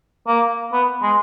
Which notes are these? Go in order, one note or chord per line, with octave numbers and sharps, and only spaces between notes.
A#3
B3
G#3